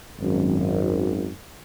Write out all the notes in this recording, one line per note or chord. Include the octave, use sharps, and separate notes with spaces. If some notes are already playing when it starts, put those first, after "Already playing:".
G#1 F#2